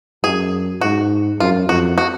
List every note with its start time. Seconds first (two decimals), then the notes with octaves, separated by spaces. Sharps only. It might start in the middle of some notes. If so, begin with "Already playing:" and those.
0.24 F#2 G#4
0.81 G#2 F#4
1.40 F#2 F4
1.69 F2 F#4
1.98 F#4